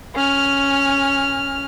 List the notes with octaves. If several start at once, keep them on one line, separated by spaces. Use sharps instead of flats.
C#4 F6